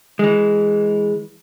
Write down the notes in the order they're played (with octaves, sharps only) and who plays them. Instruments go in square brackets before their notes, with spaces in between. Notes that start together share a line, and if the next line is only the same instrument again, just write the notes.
[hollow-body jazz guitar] E3 G#3